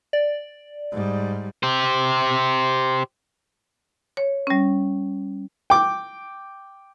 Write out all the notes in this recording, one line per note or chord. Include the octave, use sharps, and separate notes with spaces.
D5
G#2 G3
G4 C5
C#5
G3 C#4
G5 D6